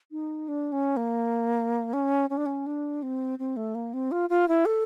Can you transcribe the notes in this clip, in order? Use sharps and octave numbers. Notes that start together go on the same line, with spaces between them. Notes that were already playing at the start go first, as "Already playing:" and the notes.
D#4
D4
C#4
A#3
C#4
C#4
D4
C#4
D4
C4
C4
A3
A#3
C4
F4
F4
E4
A4